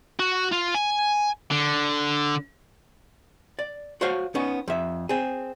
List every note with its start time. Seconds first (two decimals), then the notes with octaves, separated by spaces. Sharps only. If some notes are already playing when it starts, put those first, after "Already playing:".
0.20 F#4
0.52 F4
0.75 G#5
1.51 D3
3.59 D5
4.01 F#4 C5 C#5 F5
4.35 B3 C#4 D#4
4.68 F2 E5
5.09 C4 G#4